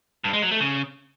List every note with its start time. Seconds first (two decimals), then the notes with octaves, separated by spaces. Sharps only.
0.24 G2
0.33 G#3
0.42 F#3
0.51 A3
0.60 C#3